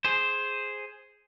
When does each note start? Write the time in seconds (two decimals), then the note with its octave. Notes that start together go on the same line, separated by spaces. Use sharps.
0.05 G#4 C5